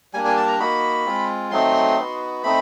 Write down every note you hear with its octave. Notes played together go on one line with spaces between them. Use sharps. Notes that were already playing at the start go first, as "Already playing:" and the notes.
G3 A#3 D4 G#5
G#5
A5
A#5
A#3 D#4 F#4 B5
G#3 C4 F4
F#3 A3 C4 D#4 C6
B3 D#4 F#4
A3 C4 D#4 B5